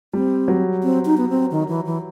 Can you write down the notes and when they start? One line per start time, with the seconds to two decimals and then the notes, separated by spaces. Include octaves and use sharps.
0.13 G3 C4
0.48 F#3
0.83 C4
1.05 D#4
1.17 B3
1.29 C4
1.51 D#3
1.68 E3
1.86 E3